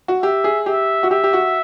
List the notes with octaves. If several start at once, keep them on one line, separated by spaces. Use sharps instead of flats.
F#4
G4 E5
G#4
G4 E5
F#4
G4 E5
G4
F#4